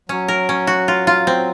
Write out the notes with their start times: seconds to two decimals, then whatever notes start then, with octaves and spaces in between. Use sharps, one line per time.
0.09 F#3 C#4
0.28 A#4
0.49 C#4
0.67 F#4
0.88 F4
1.07 F4
1.27 C4